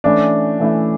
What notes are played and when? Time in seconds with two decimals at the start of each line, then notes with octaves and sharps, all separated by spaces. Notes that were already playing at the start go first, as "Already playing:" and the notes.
0.04 E3 A3 C#4 D4 E4
0.60 E3 A3 C#4 E4